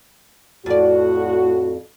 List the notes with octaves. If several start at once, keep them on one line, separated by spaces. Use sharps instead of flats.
F2 A2 F#4 D5